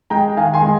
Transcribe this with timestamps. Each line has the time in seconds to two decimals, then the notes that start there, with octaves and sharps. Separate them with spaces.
0.10 G#3 G5 A#5
0.37 D#3 F5 G#5
0.54 G#5 C6
0.62 G#3